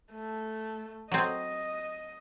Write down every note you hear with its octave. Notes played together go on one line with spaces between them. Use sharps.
A3
F#3 C4 D#5